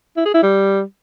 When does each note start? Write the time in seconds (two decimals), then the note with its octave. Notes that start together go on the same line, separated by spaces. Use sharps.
0.17 E4
0.25 G#4
0.34 E4
0.43 G3